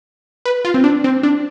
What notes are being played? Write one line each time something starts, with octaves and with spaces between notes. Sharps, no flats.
B4
F4
C4
D4
C4
D4